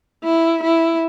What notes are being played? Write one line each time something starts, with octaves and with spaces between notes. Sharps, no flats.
E4
E4